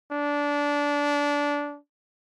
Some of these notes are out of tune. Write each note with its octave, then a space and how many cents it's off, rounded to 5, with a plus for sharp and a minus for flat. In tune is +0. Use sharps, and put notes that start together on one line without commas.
D4 -20